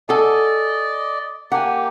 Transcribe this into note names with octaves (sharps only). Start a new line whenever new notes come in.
A4 D5 D#5 F#5 G#5
A#3 G4 F#5 G#5